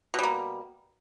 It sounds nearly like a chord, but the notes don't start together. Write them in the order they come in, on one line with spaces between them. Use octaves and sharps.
B2 G3 A#3